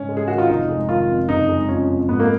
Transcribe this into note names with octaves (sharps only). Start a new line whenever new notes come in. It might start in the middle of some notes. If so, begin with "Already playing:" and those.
Already playing: G#2 C#3 C#4
G#3
G#4
D#3 F#4
F4
F1 D#4
G#3
D#3 F4
F2
F#1 D#4
G#3
F3 C#4
F2
G#2 B3
A#3